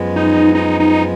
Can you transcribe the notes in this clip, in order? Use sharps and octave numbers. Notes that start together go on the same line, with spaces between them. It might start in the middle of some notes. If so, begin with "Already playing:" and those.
Already playing: F#2 F3 G#3 B3
D#4
D#4
D#4